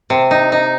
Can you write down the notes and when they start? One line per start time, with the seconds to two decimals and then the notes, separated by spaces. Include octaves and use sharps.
0.10 C3
0.31 D#4
0.52 D#4